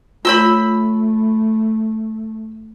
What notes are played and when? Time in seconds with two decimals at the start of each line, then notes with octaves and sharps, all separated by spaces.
0.25 A3 F4 C#5 B5 C6 E6